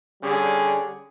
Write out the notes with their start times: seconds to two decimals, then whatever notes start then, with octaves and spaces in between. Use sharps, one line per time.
0.22 D3 G3 C#4 G#4